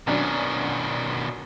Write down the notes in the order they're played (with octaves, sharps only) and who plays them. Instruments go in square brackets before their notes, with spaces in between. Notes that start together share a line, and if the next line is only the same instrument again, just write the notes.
[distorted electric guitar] B2 D#3 [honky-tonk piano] F#3 C#4 D4